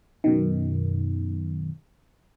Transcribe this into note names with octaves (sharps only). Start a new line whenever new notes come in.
F#2 B2 D#3